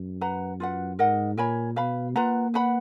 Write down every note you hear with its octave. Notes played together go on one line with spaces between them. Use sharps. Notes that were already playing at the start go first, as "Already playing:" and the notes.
Already playing: F#2
B4 F#5 A#5
F4 B4 F#5
G#2 A#4 D#5 F#5
A#2 A#4 C#5 G#5 B5
B2 B4 F5 B5
A#3 F4 B4 F#5 A#5
B4 F#5 B5